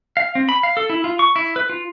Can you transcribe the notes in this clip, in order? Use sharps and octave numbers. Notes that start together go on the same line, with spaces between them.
F5
C4
B5
F5
A4
E4
F4
C#6
E4
B4
F4